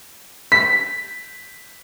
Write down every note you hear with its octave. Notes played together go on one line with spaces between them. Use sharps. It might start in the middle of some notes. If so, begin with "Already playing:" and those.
B6